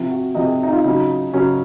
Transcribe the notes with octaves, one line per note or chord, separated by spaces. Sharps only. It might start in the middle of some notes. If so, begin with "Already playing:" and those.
Already playing: C3 F3
F#4
C3 F3 D#5
G#4
D#4
F4
C#3 F#3 D#4
C#3 F#3 C#4